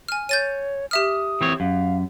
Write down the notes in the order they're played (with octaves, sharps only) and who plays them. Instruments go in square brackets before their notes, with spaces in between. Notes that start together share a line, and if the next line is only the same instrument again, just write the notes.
[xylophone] G#5 F6
[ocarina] C#5 [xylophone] G6 A6 D#7
[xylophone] G4 E5 F6 [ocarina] D#6
[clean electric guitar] E3 C4 C#5
[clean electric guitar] F#2 [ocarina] F5